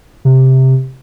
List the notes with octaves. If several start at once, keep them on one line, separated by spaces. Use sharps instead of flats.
C3